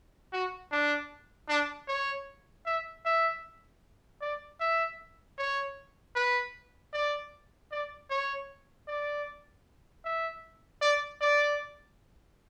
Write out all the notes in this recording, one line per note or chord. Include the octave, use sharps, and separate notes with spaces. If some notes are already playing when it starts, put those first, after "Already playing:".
F#4
D4
D4
C#5
E5
E5
D5
E5
C#5
B4
D5
D5
C#5
D5
E5
D5
D5